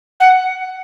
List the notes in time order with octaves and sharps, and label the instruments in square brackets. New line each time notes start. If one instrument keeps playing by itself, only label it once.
[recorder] F#5